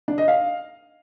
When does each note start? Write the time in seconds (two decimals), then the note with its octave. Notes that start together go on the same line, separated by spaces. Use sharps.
0.08 D4
0.18 D#5
0.28 F5